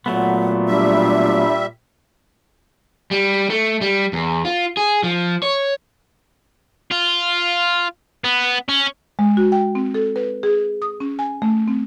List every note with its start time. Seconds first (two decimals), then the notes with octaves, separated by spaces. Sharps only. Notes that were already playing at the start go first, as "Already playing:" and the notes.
0.06 A#2 F#3 A3 B3 F#5
0.68 G3 D4 E5
3.11 G3
3.50 A3
3.81 G3
4.13 E2
4.45 F4
4.77 G#4
5.03 F3
5.43 C#5
6.91 F4
8.24 B3
8.69 C#4
9.19 G#3
9.37 F#4
9.52 G5
9.75 C4
9.94 A4
10.16 B4
10.43 G#4
10.82 D#6
11.00 C#4
11.19 G#5
11.42 A3
11.68 C4